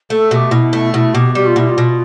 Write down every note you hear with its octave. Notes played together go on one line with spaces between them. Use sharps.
A3 A4
B2 G4 A4
B2 E4
A3
B2 E4
B2 G4
G3 G4
F4
B2 E4
F4
B2